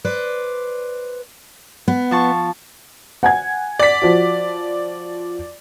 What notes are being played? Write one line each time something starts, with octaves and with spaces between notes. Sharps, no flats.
B4 C5 D5
B3
F3 A5 C#6
F#5 G#5 G#6
D5 B6
F3 F#4